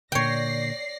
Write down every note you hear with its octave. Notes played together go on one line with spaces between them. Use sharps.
A#2 D3 C#5 D5 G5 A#6 C7